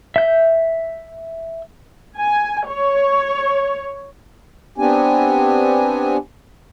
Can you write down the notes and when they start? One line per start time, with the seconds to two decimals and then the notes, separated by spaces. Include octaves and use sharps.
0.16 E5 G6
2.18 G#5
2.67 C#5
4.78 B3 C4 D4 G4 G#5